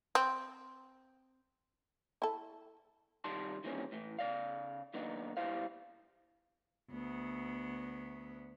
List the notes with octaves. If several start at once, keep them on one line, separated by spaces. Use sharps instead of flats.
C4
E4 A4
C2 D#3 G3 A5 C6
D#3 E3 G3 A#3 C4 C#4
A2 E3
C#3 D5 F5
F#2 D#3 A#3 B3 D4 D#4
B2 G3 E4 C5 F5
D2 B3